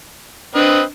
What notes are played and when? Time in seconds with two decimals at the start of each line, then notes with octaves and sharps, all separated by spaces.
0.55 C4 D4 B4 D#5